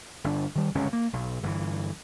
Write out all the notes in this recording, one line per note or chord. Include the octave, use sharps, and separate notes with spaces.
G1 D4
D#3 G3
G1 C#2 C3 C#4
A#3
B1
G1 G2 D3 E3